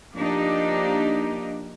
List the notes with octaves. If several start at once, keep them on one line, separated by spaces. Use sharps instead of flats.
F3 A#3 D4 D#4 G4